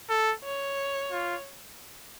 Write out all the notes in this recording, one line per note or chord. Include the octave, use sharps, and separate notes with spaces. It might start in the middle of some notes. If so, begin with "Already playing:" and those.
A4
C#5
F4